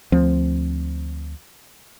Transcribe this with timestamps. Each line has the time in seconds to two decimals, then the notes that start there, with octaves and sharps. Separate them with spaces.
0.12 D2 F3 C4